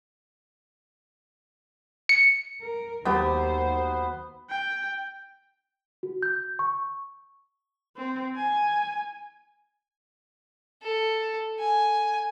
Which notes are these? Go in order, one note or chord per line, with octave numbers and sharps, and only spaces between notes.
C#7
A#4
D#2 F#3 B3 G4 C5
G5
F#4
G6
C#6
C4
G#5
A4
G#5